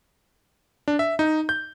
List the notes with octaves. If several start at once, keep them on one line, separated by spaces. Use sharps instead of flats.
D4
E5
D#4
G6